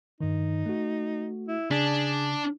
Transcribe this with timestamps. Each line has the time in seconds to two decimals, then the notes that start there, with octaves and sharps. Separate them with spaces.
0.21 G2 D#3 D#4
0.66 A3 F#4
1.48 E4
1.71 C#3 D4 G#4 B6